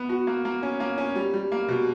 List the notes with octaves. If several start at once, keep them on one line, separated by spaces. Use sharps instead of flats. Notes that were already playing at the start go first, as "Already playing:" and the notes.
Already playing: B3
F#4
A#3
A#3
C#4
A#3
C#4
G3
G3
A#3
B2